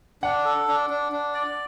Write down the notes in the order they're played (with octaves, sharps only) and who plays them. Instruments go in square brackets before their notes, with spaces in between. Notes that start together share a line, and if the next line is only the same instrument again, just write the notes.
[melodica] D4 [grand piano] F#5
[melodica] A4
D4
D4
D4
D5